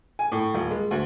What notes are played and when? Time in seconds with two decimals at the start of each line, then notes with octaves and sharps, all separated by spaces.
0.19 G#5
0.32 A2
0.54 D#1
0.71 G#3
0.91 D2